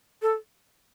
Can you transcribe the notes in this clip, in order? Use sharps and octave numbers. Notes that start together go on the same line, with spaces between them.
A4